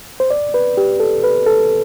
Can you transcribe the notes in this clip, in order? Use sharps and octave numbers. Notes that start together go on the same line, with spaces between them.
C5
D5
B4
G4
A4
B4
A4